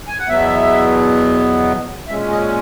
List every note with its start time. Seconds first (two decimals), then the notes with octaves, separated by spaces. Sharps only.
0.08 G#5
0.18 F#5
0.29 E2 B2 F#3 B3 E5
2.08 A#2 G#3 C#4 E5
2.31 D#5